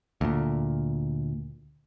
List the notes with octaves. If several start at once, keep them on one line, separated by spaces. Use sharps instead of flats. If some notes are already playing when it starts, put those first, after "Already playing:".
D2 A#2